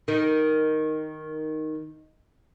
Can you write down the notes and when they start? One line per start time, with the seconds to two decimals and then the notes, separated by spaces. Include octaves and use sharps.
0.08 D#3